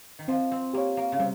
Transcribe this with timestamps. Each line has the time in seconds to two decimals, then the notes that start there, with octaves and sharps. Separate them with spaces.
0.19 D#3
0.28 F3 C4
0.51 C4
0.74 A#3 G4 C#5
0.97 A#3
1.12 C#3
1.20 C3 G3